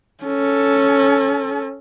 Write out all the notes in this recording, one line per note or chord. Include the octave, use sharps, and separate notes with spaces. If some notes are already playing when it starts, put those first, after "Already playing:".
C#4 A4